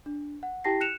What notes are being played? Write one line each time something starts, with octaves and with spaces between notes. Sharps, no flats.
D4
F#5
E4 G4 G5 A5 A#6 C7
F#6 C#7 E7 F7